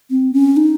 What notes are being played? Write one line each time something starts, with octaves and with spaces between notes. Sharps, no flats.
C4
C#4
D#4